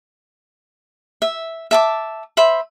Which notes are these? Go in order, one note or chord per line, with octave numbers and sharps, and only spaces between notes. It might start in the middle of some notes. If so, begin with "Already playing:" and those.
E5
E5 A5 D6
C5 E5 B5